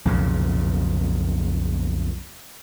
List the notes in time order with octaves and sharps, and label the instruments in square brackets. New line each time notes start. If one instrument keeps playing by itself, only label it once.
[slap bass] B1 F2 A#2 C#3